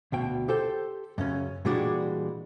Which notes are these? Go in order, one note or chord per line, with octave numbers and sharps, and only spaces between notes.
D2 B2 G5
G4 A4 C5 G5
F#2 C#3 C#4
A#2 E3 G3 G#3 D4 F#4